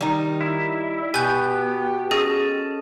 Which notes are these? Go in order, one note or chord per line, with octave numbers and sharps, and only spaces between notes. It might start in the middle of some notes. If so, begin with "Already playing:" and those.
D#3 G3 D#4
E4
B2 B3 G4 G#5 G6
C#4 G#4 A4 D#5